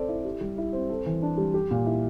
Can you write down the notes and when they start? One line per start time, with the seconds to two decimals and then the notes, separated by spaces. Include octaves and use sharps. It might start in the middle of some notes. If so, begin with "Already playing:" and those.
Already playing: C4 A4 D5
0.08 E4
0.25 G4
0.41 G3
0.58 E4
0.73 C4
0.90 A4
1.06 E3
1.22 D4
1.38 G3
1.54 G4
1.71 A#2
1.86 E4